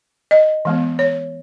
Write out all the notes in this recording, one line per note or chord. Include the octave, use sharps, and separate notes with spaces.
D#5
E3 G#3 B3
C#5